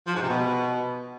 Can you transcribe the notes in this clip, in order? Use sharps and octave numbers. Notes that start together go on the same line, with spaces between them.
F3
G#2
C3
B2